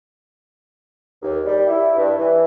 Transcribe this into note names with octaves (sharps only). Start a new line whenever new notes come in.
D#2
G3
E4
G2
E3